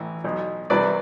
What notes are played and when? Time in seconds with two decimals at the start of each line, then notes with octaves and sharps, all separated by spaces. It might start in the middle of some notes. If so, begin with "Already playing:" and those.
Already playing: A1 A2 E3
0.24 B1 B2
0.70 C2 C3 E3 B4 D5